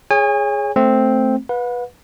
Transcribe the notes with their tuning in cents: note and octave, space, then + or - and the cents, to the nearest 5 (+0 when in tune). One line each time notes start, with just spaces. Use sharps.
G#4 +0 C#5 +0 G#5 -35
A3 +0 C4 +0
B4 -10 F#5 -45